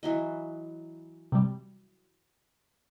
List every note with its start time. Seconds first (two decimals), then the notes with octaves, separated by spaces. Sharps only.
0.03 E3 F#3 D#5
1.32 C3 G3